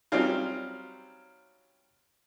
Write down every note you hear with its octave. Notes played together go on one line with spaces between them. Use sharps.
F#3 G3 C4 C#4 D#4 F4